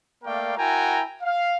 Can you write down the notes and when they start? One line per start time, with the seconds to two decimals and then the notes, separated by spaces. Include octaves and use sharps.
0.24 A3 A#3 A#4 D5 F5 G5
0.56 E4 F#4 A#4 G5 G#5 A#5
1.22 F5